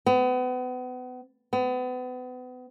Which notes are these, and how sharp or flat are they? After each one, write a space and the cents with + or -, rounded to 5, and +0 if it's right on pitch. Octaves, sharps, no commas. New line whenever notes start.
B3 +35
B3 +35